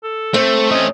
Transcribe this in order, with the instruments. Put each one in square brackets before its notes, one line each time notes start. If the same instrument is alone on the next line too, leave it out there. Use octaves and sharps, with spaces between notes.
[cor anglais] A4
[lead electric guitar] A3 [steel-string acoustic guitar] C4
[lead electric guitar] A3 C#4 [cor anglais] D#5